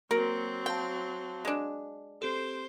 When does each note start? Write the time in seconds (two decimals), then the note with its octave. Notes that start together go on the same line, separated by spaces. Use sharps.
0.11 F#3 A#3 C4 F#4 A#4
0.66 F5 G5 A5
1.45 G#3 D4
2.22 C4 G4 A4 C5